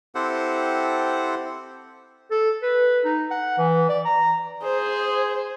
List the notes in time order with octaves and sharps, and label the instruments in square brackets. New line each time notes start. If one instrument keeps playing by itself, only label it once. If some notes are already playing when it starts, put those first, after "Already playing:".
[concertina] C4 E4 G4 A4 C5 F#5
[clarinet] A4
B4
D#4
F#5
E3
D5
A#5
[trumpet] G#4 [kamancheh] C5